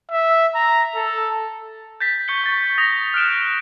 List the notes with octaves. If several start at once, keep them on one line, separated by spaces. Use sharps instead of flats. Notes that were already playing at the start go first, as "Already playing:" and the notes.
E5
A#5
A4
G6 A6 B6
C#6 G6 C#7 G7
C#6 A6
D#6 A#6 F7
F6 F#6 D7 E7